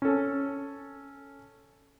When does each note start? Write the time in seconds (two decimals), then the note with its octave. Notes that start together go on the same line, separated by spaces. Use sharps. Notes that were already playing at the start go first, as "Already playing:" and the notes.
0.02 C#4 A4